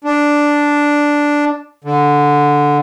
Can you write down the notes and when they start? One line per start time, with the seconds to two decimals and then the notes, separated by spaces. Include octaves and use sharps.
0.04 D4
1.84 D3